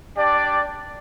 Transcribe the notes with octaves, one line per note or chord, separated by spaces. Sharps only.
D4 G4 D5